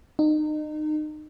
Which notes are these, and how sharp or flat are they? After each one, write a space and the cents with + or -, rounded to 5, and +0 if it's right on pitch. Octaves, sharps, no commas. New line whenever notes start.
D#4 -30